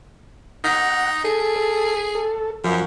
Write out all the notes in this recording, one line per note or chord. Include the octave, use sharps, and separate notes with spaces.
D#4 F#5
G#4 A4
A4
A4
F#2 F3